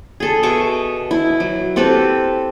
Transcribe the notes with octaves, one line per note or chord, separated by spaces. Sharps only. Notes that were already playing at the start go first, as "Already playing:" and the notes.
G#4 A4
B2 E5 C#6 D6
E4
F#3
C4 G4 A4 B4